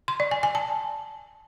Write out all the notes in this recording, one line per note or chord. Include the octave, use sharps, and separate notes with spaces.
C6
D5
G#5
G#5
A5